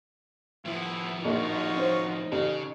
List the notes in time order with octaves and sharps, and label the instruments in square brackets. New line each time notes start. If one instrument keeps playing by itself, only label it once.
[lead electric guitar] A2 F3 [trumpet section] B3 E4
[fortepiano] A#1 [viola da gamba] D#4 [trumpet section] F4 F#4 C#6
[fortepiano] C#4 C5
[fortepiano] A1 [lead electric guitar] C#3